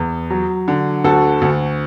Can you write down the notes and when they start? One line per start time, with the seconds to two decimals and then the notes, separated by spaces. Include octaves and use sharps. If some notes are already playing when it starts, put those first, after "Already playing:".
Already playing: E2
0.30 F#3
0.68 D3
1.04 D2 F#4 A4
1.41 D2